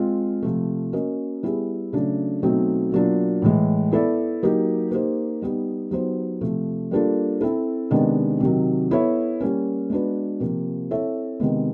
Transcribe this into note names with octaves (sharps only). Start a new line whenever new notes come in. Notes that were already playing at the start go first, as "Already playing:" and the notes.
Already playing: G#3 C4 F4
C3 F3 A3
A#3 C#4 F#4 A#4 D#5
G3 B3 E4 G#4
C#3 F#3 A3 D4
B2 F#3 A3 C4 D#4
B2 F#3 A#3 D4 F4
A2 E3 G#3
B3 E4 A4 D5
F#3 A#3 D#4 G4
A#3 D#4 G4 C5
G3 B3 D#4 G4
F#3 B3 D#4 G4 C5
C3 F3 A3
G3 A#3 D4 F4 A4
C4 E4 A4
C3 D#3 G#3 B3 D4
C3 D#3 F#3
B3 E4 A4 C#5 E5
G3 A#3 C#4
G#3 B3 D4 F#4 B4
C3 F3 A#3
C4 E4 A4 C#5 E5
C3 D#3 G#3 B3